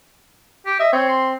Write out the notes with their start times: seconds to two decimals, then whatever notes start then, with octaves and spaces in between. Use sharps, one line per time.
0.66 G4
0.80 D#5 E5
0.93 C4 C#5
1.09 C6